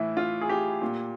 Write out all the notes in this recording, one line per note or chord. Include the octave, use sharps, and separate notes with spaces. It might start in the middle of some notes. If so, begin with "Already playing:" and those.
Already playing: A2 E3 E4
F4
G#4
G4
A#2